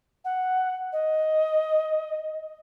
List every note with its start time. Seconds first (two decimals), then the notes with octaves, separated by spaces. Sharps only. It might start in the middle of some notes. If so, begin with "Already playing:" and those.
0.25 F#5
0.92 D#5